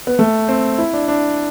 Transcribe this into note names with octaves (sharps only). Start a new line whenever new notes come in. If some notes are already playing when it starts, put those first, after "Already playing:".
B3
A3
C4
E4
D4
D4